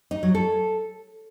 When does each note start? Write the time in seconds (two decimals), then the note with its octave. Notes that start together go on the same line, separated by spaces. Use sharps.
0.11 D#4
0.23 F#3
0.35 A4